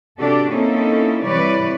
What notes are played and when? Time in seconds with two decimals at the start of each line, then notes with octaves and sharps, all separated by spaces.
0.19 C3 D4 F#4 G4 A4
0.50 A#3 C4 C#4 D#4 E4 A4
1.24 C3 E3 G3 B4 C#5 D5